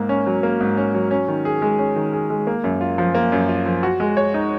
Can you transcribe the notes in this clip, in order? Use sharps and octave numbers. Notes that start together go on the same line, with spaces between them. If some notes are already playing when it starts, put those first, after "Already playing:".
Already playing: G#2 A#3
C#4
F#3
A#3
G#2
C#4
F#3
C#4
D#3
G#4
G#3
C#4
D#3
G#4
G#3
A#3
F#2
F4
F3
A#3
F#2
F4
F3
F#4
G#3
C#5
D#4